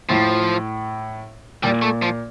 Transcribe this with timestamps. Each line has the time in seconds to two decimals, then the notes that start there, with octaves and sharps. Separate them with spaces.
0.09 A2 F3
1.63 A#2 G3
1.82 A3
2.02 F3